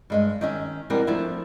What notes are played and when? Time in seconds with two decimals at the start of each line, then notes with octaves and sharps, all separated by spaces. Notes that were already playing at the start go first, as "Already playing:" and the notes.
0.10 G2 G#3 D#5
0.41 D#3 C#4 D#5 E5
0.90 B2 E3 G3 B3 C4 A#4
1.07 F3 A3 D4 E4